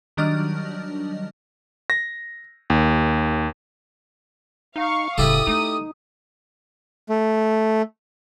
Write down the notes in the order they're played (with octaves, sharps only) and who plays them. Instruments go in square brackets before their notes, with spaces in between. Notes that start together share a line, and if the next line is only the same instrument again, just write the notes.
[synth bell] D#3 F#3 G3 D4 D#5 F6
[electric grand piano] A#6
D#2
[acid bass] D#4 [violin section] F5 C#6
[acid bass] E1 [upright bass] A2 C#3 [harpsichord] E4 G4 A4 [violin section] D#6
[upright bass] A3 [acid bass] D#4
[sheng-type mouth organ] A3